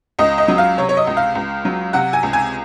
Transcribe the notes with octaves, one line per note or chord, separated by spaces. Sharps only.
C#2 D#5
D#5
F#3
F5
C3 C#5
C#5
D#5
C#2
F5
C#2
F#3
C3 F#5
G#5
C#2
G#5